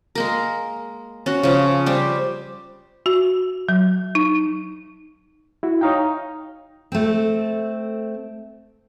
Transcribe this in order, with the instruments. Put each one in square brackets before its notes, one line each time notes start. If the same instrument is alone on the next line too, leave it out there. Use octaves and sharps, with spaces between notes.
[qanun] G#3 A#3 A#4
C#4 F#4
C#3 F3
G3 G4 C5
[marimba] F#4
F#3
D#4
[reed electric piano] E4 F#4
[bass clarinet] D#4 [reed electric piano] C#5 F5 G5
[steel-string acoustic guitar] A3 C4